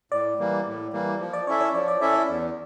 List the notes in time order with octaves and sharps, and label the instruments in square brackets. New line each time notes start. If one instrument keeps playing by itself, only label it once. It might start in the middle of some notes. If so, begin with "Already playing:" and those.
[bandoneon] A2 [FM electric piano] D5
[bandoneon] E3 G3 A#3
A2
E3 G3 A#3
F3
[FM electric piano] D5
[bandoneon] C#4 E4 A4 E5 [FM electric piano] C#5
[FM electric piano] C#5
[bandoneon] F3 [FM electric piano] D5
[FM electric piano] D5
[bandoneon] C#4 E4 A4 E5 [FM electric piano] D5
[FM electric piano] D5
[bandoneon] E2